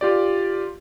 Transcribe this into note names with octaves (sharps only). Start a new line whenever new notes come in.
F4 G4 D5